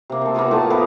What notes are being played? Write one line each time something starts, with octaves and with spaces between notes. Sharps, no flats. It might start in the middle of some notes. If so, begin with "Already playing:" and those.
C3 A#3
C4 A4
A#3 B3 F4 G#4
A2 A3 A5
F3 B3 G4 A#4